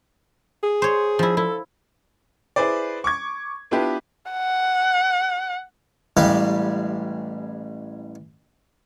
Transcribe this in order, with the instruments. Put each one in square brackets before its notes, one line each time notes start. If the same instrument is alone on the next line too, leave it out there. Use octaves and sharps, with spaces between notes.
[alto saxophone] G#4
[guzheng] C5 C#5
F3 E4
[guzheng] E4 [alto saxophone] A4
[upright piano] E4 G#4 B4 C5 D5
C#6 D6 G#6
B3 D4 E4 F4 G4 B4
[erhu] F#5
[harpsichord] A1 G3 G#3 G4 F5